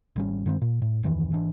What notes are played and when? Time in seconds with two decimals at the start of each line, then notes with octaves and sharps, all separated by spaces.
0.16 G#1 G3 C#4
0.46 G2 D#3 G#3 C4
0.61 A#2
0.82 A2
1.03 D1 F2 D#3 E3
1.32 G#1 E3 D4